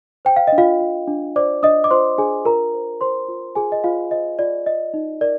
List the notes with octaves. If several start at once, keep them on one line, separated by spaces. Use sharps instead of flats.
C5 G5
F5
D4 D#5
F4 F5
F4
D4
C5 D5 D6
D4 D#5 D#6
D6
F4 C5 C6
D4 G#4 G#5
F4 A#4 A#5
C5
C5 C6
F4
F4 G#4 G#5
D#5
F4 C5 F5
C5 D#5
F4 D5
D5 D#5
D#4
A#4 D5